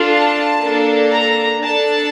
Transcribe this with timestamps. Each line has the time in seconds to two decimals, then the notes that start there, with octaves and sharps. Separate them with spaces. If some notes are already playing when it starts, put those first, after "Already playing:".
Already playing: D4 F4 A4
0.13 A5
0.63 A#3 D4 A4
1.13 A#5
1.63 D4 A4 A5